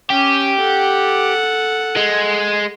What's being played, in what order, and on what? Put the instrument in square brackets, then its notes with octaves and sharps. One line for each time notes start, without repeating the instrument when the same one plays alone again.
[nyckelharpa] C#4 [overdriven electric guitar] G4
[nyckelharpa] A4 F#5
[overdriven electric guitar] G#3